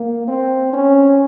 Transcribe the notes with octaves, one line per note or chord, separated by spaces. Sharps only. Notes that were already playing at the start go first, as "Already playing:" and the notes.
Already playing: A#3
C4
C#4